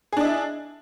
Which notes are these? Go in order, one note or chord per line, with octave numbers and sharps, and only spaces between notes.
D4 E4 G#4 D#5